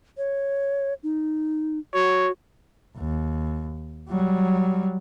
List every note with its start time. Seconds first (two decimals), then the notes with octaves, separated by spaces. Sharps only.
0.17 C#5
1.03 D#4
1.94 F#4 C#5
2.97 D#2
4.09 F#3 G3